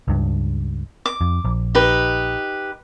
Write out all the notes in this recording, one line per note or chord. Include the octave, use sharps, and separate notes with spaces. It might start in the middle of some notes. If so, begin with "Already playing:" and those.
C#2 G2
D6
F2
A#1
D#4 G4 B4